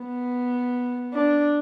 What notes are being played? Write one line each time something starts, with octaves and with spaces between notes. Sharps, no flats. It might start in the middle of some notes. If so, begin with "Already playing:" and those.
Already playing: B3
D4